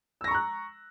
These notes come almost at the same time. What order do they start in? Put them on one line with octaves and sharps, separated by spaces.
E6 A#6 C#6 A#5 F#6